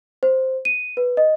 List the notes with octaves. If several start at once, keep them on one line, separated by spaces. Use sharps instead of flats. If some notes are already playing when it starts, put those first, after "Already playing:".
C5
D#7
B4
D#5